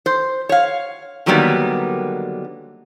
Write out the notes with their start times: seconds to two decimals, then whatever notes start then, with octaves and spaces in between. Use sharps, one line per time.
0.06 C5
0.49 C#5 F5
1.26 D3 D#3 F#3 G3 A#3 B3